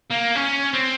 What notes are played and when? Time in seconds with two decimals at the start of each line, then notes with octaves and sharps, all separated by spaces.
0.11 A#3
0.36 C#4
0.74 C4